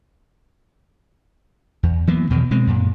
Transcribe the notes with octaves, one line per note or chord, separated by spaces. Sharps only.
E2
E3 F#3 A#3 B3
E2 B2 D#3 F#3
B2 G#3 C4
F#2 A#2